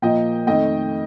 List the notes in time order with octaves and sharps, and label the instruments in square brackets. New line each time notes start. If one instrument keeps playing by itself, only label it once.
[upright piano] A#2 F3 A#3 D#5 G5
F2 D#3 A3 D#5 G5